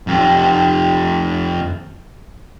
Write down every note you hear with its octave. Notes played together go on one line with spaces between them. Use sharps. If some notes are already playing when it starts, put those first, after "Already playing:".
F2 G4